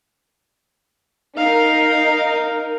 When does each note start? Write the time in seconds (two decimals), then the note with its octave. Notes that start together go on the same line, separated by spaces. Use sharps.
1.37 D#4 A#4 F5